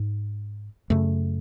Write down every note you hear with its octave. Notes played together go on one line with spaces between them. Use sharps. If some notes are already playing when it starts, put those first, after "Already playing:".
Already playing: G#2
F#2 C#3 A3